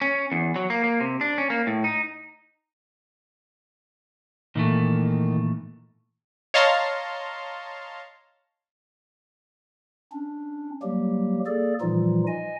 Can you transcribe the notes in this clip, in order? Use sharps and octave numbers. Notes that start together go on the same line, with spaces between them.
C#4
E2
F#3
A#3
A#3
C3
D4
C#4
A#3
A2
D#4
A#2 D#3 E3 A3
C#5 D#5 F5 A5 A#5 C6
C#4 D4
F#3 G3 A#3 G4
A#3 G#4 A4 D5
A#2 E3 F3 G3 D#4 F4
D#5 G#5